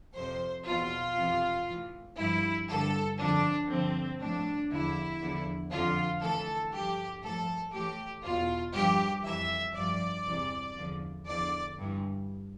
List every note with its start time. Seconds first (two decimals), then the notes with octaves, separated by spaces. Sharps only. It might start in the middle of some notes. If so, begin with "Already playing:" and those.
0.16 F2 C3 F3 C5
0.66 E2 B2 F4
1.17 F2 C3 E3
1.67 A2 E3
2.18 G2 F3 E4
2.69 G2 D3 F3 A4
3.19 F2 D3 F3 D4
3.69 G2 D3 F3 C4
4.20 A2 F3 D4
4.71 E2 D3 F3 E4
5.21 E2 D3 F3
5.71 F2 D3 F3 F4
6.22 A2 E3 A4
6.72 G2 F3 G4
7.23 A2 F3 A4
7.73 A2 E3 G4
8.24 E2 B2 F4
8.74 G2 F3 G4
9.24 F2 E3 E5
9.75 G2 F3 D5
10.25 E2 C3 E3
10.76 E2 D3 F3
11.26 E2 D3 F3 D5
11.78 G2 E3